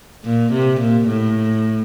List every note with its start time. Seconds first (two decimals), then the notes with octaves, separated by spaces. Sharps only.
0.25 A#2
0.52 C3
0.81 A#2
1.08 A2